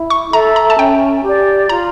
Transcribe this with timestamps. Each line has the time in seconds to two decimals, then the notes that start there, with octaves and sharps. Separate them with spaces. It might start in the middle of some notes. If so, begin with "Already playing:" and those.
Already playing: E4
0.10 C#6
0.33 A4 E5 A#5
0.56 A#5
0.70 A5
0.78 C#4 G5
1.23 G4 D5
1.69 F4 A#5